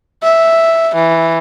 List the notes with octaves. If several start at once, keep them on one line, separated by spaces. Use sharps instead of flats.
E5
E3